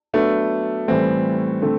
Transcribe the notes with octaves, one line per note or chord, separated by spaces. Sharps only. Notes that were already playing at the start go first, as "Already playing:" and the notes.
F#3 A3 B3 D4 A4
A2 E3 G3 C4
D3 A3 C4